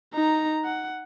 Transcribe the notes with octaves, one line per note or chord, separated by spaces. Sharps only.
D#4 A#5
F#5